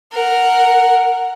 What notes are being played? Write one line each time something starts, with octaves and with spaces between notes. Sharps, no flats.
A#4 F#5